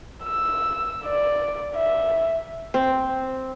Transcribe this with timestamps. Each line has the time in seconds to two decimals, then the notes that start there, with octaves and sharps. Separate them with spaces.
0.24 E6
1.05 D5
1.76 E5
2.74 C4